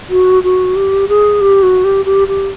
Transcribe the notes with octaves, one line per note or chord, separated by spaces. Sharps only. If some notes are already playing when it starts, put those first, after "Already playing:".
F#4
F#4
G4
G#4
G4
F#4
G4
G4
G4